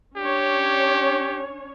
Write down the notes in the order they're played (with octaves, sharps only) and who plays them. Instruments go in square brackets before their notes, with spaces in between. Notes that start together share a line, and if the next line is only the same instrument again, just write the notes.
[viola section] C#4 D4 C#5 [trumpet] G4